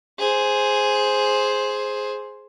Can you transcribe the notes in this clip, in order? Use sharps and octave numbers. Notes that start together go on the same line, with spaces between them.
G#4 C5